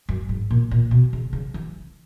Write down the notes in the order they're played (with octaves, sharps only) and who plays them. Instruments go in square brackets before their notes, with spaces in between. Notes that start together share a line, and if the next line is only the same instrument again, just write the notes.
[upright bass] F#2
G#2
A#2
A#2
B2
C#3
C#3
E3